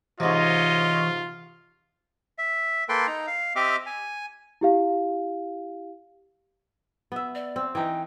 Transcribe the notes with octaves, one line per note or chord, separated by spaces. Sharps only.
G#2 C3 E3 F4 C#5 D#5
E5
A#3 A4 B4 G5 C6
D#4 A#5
F5
C4 G4 D#5 E5 D6 F6
G#5
E4 G4 F5
B3 E5
D5
C4
E3 D#4 G5